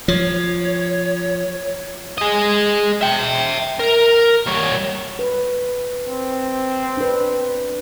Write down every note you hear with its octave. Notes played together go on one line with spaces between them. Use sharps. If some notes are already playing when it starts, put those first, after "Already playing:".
F3 C#5
G#4 D#5
E5 G5
A#4
G3 C#5
B4
C4
D4 B4